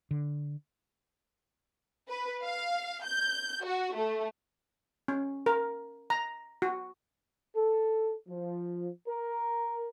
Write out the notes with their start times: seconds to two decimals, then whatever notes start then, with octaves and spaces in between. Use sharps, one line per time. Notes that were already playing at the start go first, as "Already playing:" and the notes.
0.11 D3
2.08 B4
2.43 F5
3.04 G6
3.64 F#4
3.94 A3
5.08 C#4
5.46 A#4
6.10 A#5
6.62 F#4
7.56 A4
8.28 F3
9.08 A#4